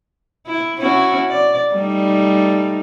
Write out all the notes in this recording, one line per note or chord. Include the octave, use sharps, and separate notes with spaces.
E4
C#4 E4 F#4
D5
G3 A3 D#4